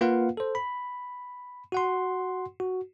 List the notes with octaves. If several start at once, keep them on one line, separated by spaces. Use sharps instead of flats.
A#3 F4 B4 F5 F#5
A4 C5
B5
F#4 F#5 C6
F#4